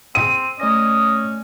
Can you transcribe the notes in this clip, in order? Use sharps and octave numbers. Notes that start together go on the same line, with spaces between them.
C4 D#7
A3 C#4 D5 D#5 A#6